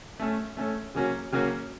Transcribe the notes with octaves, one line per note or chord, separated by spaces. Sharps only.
A3 C#4 A4
A3 C#4 A4
C#3 F#3 A#3 C#4 F#4
C#3 F#3 A#3 C#4 F#4